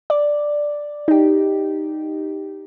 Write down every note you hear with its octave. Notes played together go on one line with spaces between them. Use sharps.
D5
D#4 G4